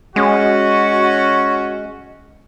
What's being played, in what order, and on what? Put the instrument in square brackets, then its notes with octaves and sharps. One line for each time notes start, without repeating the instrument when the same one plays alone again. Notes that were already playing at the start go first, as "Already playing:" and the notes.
[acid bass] G#3 [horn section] C#4 F#4